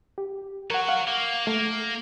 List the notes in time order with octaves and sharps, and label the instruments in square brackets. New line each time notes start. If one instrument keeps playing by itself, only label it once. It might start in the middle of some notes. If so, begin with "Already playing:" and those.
[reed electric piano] G4
[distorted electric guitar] F#4 C#5 [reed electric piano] A#4 F#5
[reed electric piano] F5 F#5
[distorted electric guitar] A#3
[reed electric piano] A3 [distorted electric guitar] A#3